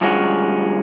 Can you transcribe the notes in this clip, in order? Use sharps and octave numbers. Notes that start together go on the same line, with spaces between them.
D2 G2 F3 G#3 C#4 F#4